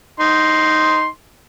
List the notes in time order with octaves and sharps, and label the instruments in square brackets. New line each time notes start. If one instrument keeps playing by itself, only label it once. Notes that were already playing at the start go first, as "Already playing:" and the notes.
[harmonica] D#4 C6